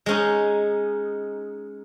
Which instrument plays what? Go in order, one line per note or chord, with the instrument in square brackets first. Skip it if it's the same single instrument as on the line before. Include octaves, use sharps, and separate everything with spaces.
[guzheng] G#3 C#4 D#4